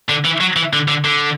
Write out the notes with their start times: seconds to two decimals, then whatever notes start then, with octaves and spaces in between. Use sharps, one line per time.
0.09 D3
0.24 E3
0.40 F#3
0.56 E3
0.73 D3
0.88 D3
1.05 D3